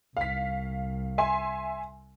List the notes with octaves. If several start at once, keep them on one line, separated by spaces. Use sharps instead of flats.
C2 F5 B6
E5 G#5 C6